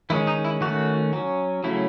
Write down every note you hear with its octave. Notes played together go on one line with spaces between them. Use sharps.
D#3 G#3 C#4 E4
D#4
E4
D#3 A3 C#4 F#4
F#3 C#4
C#3 F#3 A3 C#4 E4